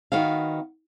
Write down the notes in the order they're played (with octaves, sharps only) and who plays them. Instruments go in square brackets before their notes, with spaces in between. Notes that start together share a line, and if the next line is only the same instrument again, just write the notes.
[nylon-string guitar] D#3 B3 F#4 F5